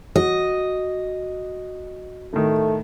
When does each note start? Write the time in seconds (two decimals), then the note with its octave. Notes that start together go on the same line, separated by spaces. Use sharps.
0.16 F#4 D#5
2.33 A2 D#3 A3